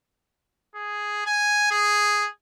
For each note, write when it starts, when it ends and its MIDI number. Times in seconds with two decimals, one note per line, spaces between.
0.75 1.21 68
1.26 1.68 80
1.71 2.28 68